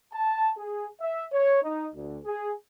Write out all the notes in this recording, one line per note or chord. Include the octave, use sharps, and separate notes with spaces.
A5
G#4
E5
C#5
D#4
D2
G#4